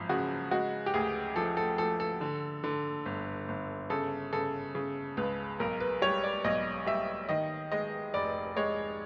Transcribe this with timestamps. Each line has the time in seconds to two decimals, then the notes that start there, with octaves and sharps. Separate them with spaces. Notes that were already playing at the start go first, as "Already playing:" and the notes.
Already playing: G#1 F#2 F3
0.09 C#3 F#4
0.51 G#3 F#4
0.86 G4
0.94 D2 G#4
1.36 F3 A4
1.57 A4
1.78 F3 A4
2.00 A4
2.21 D3
2.64 D3
3.06 G1
3.48 G1
3.90 C#3 A4
4.33 C#3 A4
4.75 C#3
5.17 C#2 B4
5.60 B1 A#4
5.80 B4
6.02 G3 C#5
6.23 D5
6.44 B1 D#5
6.87 G3 E5
7.29 D#3 D#5
7.72 G#3 D#5
8.14 F1 D5
8.57 G#3 C#5